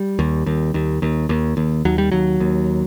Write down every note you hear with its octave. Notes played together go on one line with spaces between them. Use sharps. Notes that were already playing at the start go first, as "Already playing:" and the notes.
Already playing: G3
D#2
D#2
D#2
D#2
D#2
D#2
D#2 F#3
G3
D#2 F#3
D#2